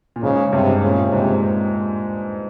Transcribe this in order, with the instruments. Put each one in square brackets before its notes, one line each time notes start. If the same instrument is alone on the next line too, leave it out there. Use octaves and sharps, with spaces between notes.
[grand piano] A#2
[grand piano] G#2 [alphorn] C#3
[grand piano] G2 [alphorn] C3
[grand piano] G#2
[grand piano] A#2 [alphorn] C#3
[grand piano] G#2 [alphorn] C3